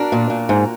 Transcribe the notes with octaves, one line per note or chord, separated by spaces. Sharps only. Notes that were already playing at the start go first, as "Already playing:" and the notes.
Already playing: D4 F#4 A#4
A#2
A#2
G#2